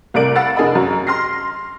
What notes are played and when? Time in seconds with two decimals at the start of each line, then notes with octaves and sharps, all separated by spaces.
0.14 C2 A3 A#4 D5 D7 F#7
0.36 F5 F#5 B5 E6 A6
0.56 F1 D4 G#4 A#4 D#5 B5
0.75 F#2
1.07 C6 F6 A#6 C7